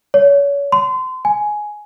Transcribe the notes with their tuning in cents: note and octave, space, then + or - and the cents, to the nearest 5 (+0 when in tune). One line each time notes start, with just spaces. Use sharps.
C#5 +30
C6 -30
G#5 +10